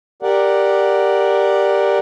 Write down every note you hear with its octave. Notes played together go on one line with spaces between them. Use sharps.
G4 A#4 D5 F#5